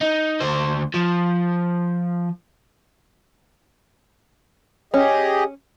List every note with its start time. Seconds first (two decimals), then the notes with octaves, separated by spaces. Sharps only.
0.01 D#4
0.41 D2 C5
0.94 F3
4.94 C#4 G4 G#4 D#5